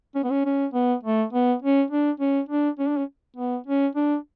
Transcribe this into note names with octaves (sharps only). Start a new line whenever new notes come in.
C#4
B3
C#4
C#4
B3
A3
B3
C#4
D4
C#4
D4
C#4
D4
C#4
B3
C#4
D4